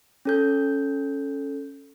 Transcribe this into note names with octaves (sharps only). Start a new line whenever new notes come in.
C#4 A4 G6